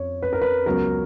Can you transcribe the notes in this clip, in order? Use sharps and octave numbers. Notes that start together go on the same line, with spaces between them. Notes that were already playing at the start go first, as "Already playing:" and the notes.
Already playing: F2 C#5
B4
A#4
B4
C#2 C#3 F#3 B3 A#4